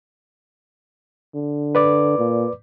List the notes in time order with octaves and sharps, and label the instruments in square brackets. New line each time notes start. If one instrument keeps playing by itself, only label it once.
[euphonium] D3
[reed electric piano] B4 D5 D6
[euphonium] A#2